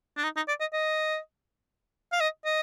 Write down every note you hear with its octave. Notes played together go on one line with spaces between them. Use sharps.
D4
D#4
D#4
D5
D#5
D#5
F5
D#5
D#5